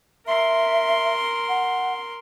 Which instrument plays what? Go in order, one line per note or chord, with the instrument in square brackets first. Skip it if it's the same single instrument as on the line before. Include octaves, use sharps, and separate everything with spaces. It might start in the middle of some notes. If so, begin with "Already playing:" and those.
[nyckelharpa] A#4 C6 [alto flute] E5
[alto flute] F#5